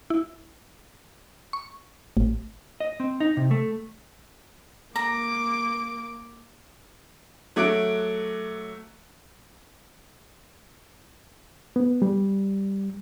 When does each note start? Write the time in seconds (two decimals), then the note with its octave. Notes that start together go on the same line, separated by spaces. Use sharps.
0.10 E4
1.53 C#6
2.17 A1
2.80 D#5
3.00 C4
3.20 D#4
3.37 C3
3.51 A3
4.96 A#3 A#5 D6
7.56 F#3 A3 D6 F#6 D7
11.76 B3
12.02 G3